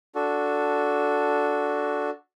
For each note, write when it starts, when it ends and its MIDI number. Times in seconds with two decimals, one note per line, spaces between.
0.15 2.10 62
0.15 2.10 66
0.15 2.10 69